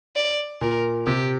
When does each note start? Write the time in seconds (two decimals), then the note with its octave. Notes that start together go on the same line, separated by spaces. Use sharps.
0.16 D5
0.61 A#2 A#4
1.06 C3 G4